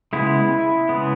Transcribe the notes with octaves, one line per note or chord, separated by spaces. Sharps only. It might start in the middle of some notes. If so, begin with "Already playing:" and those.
C#3 G#3 B3 E4
C#3 G#3 B3